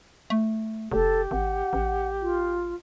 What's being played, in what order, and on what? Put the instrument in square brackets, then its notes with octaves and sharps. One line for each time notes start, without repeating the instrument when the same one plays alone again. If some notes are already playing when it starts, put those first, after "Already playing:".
[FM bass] A3
[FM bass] F1 [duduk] G4 [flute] A4
[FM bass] G#1 [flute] F#5
[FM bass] A1
[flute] F4